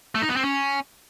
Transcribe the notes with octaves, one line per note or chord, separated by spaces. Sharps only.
A3
D#4
B3
C4
C#4